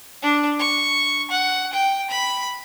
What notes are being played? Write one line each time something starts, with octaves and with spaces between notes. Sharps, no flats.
D4
C#6
F#5
G5
B5